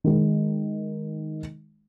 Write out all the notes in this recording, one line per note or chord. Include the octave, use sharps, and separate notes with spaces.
D#3 G#3